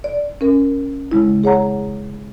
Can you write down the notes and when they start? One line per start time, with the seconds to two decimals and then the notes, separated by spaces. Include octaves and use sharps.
0.04 D5
0.41 C#4 A#4
1.11 C#3 G#3 E4
1.44 G#4 C#5 F#5 A#5